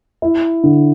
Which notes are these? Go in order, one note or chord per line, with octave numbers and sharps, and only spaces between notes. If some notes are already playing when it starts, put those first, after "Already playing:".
E4
D3